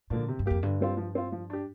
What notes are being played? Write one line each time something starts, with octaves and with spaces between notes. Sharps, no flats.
A#2 D3 F3 A#3 D4
C3
G2
F2 A#3 G4
G2 D3
G3 C4 F4
F3
C4 F4
F3
D4 G4